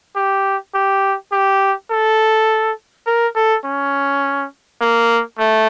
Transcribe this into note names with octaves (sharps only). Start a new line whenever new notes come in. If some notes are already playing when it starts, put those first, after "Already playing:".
G4
G4
G4
A4
A#4
A4
C#4
A#3
A3